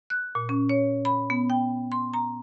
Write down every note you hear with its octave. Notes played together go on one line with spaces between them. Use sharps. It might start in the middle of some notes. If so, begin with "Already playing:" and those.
F#6
A#2
C#4
C#5
B5
B3
G5
C6
A#5